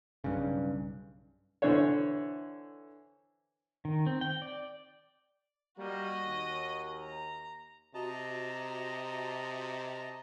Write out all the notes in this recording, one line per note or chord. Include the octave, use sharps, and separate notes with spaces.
B1 G2 C#3
D3 E3 C5 C#5
D#3
C4
G5
D5
G3 A#3 F#4 D#5
D#2
A#5
C3 F#4 D#5 A5 A#5